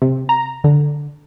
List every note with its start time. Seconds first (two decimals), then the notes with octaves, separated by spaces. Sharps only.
0.02 C3
0.29 A#5
0.64 D3